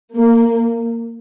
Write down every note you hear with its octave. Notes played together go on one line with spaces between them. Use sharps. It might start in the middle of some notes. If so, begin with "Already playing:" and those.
A#3